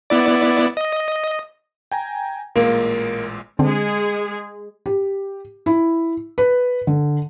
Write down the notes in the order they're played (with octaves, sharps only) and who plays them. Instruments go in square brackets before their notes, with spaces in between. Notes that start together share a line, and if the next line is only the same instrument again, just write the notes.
[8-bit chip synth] B3 E4 D5
D#5
[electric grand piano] G5 G#5 A#5
[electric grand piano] A1 A#2 G#3 [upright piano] A#3
[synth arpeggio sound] D3 C4 [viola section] G#3 G#4
[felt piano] G4
E4
B4
D3